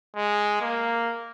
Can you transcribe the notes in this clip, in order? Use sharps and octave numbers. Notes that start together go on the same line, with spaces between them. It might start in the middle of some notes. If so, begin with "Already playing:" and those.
G#3
A#3